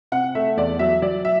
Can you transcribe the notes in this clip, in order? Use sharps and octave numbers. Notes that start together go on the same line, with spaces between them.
C3 F#5
A3 E5
E2 D5
F#3 E5
F#3 D5
E5